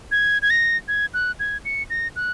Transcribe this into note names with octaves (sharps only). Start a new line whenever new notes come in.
G#6
G#6
A#6
G#6
F#6
G#6
C#7
A#6
F#6